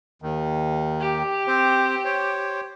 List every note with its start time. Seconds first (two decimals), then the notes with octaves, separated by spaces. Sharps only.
0.22 D#2 D#3
1.00 G4
1.47 C4 C5
2.05 C5 C#5